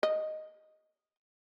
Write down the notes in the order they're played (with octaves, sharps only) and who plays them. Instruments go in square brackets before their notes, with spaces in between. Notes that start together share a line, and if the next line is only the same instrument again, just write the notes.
[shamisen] D#5